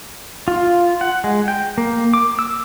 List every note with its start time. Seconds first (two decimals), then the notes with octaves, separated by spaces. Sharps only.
0.48 F4
1.01 F#5
1.24 G#3
1.48 G5
1.78 A#3
2.13 D6
2.39 E6